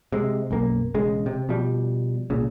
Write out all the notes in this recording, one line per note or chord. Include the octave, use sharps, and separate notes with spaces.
C3 G#3
B1 F#2 A#3
E1 C#3 G#3
C3
B2 F3 G3
C2 A#2 C#3